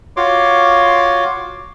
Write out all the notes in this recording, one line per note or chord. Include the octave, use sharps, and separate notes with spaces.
F4 F#4 C#5 C6 D6